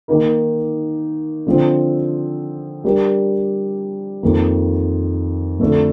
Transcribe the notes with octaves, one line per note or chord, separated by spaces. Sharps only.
D#3 A#3 D#4 A#4
D3 F3 C4
G3 D4 G4 A#4
F2 D#3 A#3
F2 D3 A3 D4